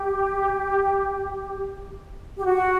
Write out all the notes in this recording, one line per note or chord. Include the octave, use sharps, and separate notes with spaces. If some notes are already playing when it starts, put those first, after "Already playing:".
Already playing: G4
G4
F#4